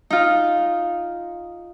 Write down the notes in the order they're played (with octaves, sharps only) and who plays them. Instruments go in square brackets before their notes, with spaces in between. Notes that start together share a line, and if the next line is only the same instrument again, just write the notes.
[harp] D#4 F4